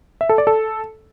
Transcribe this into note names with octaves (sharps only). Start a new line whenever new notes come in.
E5
A4
D5
A4